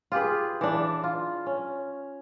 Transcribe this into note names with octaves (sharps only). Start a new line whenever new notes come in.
F4 G4 G#4 B4
E3 D4
F4
C#4